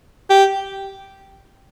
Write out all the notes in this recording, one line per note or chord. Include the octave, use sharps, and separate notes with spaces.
G4